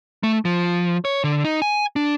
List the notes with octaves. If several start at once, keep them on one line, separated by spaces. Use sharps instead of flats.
A3
F3
C#5
D3
D#4
G#5
D4